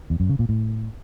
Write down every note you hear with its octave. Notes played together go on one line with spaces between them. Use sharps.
E2
F#2
C#3
A#2
A2